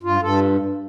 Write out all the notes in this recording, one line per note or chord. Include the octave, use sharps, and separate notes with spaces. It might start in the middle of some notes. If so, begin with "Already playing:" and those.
G2 F4
G2 A4